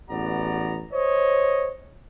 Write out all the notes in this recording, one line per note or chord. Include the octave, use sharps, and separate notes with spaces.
A1 E2 B3 F#4 D5 A#5
C5 C#5 D#5